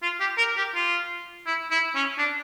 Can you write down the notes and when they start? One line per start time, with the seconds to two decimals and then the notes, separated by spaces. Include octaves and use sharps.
0.03 F4
0.20 G4
0.38 A#4
0.57 G4
0.75 F4
1.46 E4
1.71 E4
1.95 C#4
2.18 D4